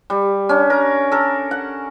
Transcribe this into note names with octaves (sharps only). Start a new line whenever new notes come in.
G3
C#4 D4
A#4
A4 A#4
F#5